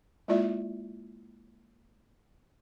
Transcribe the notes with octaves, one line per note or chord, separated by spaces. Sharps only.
G#3 A#3 E4 F4 D5 E5